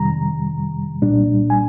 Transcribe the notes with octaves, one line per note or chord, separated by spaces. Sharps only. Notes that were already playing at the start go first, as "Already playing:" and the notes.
Already playing: F2 C3 D#3 G3 A#5
C2 A#2 G3 D4
G#5